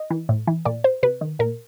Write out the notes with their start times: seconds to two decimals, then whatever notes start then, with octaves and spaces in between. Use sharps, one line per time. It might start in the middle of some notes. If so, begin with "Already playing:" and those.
Already playing: D#5
0.10 E3
0.29 A2
0.47 E3
0.65 A#2 D5
0.84 C5
1.03 C3 B4
1.21 D#3
1.39 A#2 A#4